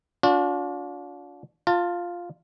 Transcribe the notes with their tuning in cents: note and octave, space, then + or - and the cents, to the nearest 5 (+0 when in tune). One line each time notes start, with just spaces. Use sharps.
D4 -35 F4 +40
F4 +0 A5 +25